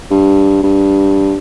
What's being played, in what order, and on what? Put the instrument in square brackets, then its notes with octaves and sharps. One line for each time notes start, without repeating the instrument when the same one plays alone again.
[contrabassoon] G2
G2